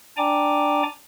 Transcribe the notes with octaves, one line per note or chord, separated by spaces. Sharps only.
D4 D5 G5 G#5 A#5 D6